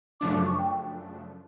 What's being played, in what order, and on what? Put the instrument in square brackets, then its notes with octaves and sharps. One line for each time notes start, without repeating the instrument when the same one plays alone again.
[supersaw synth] F#2 C#3 F3 A3 D4 [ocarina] D6
[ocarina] D6
C#6
G5